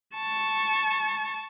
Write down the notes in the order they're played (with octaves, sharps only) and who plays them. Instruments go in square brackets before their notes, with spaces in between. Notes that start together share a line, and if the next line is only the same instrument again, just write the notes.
[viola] A5 C#6